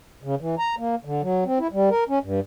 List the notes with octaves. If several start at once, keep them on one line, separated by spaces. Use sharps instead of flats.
C#3
E3
A#5
A#3
D3
F#3
C4
E4
G3
A#4
C#4
G2